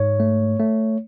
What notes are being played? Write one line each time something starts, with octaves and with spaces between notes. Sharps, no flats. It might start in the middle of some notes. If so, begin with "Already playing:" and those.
Already playing: G#2 C#5
A3
A3